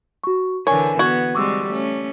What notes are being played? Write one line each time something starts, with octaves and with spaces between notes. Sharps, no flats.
F#4 C#6
D3 E3 D4 A#4 C#5 G#5
B3 F#4 G#6
G3 G#3 C4 C#6 D6 E6
A3 C#4